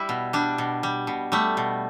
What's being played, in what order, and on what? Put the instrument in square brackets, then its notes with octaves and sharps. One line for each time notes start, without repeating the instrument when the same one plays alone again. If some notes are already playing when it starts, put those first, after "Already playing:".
Already playing: [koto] G3 E4
B2
G3 D4
B2
G3
B2
G3 A3
B2